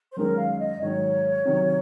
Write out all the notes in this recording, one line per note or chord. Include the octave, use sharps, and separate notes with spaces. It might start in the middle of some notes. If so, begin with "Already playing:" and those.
C5
F#2 D#3 G#3 C#4 A#4
F5
D#5
G#2 D#3 F#3 C#5
C3 D#3 F#3